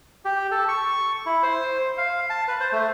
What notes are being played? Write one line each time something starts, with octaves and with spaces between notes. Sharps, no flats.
G4
A4
C#6
E4
C5
F5
A5
B4
C5
A3